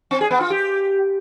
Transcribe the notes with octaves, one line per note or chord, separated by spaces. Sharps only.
C4
G#4
B3
F4
G4